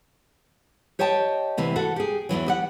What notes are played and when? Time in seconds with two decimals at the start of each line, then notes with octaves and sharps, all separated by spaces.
0.99 G4 C#5 D#5 G5 A5
1.57 D2 C3 E3
1.76 F#4 A4 F#5
1.96 G4 G#4
2.29 E2 G#2 E3 F#3
2.46 G4 D#5 F#5